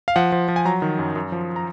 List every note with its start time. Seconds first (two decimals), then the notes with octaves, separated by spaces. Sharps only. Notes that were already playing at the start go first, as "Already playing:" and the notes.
0.08 F5
0.16 F3 F#5
0.32 F3
0.48 F3
0.56 G#5
0.65 F#3 A#5
0.82 D#3
0.99 F#2
1.16 F#2
1.32 F3
1.56 A#5